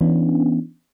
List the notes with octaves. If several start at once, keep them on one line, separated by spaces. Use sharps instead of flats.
E3 B3 C#4 D4